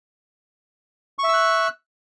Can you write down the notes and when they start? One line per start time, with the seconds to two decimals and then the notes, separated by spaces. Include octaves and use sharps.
1.19 C#6
1.24 E5
1.29 E6
1.34 F#6